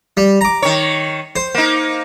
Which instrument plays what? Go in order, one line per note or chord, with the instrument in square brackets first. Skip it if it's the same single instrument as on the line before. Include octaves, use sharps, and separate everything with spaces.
[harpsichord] G3
A#5 D6
[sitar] D#3 C#5
[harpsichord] C5
[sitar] A#3 D#4